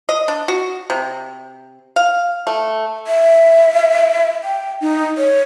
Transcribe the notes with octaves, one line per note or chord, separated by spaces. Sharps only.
D#5
D4
F#4
C3
F5
A3
E5
G5
D#4
C#5